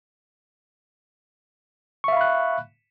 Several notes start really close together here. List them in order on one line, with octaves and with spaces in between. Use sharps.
C#6 E5 F5 B5 F#6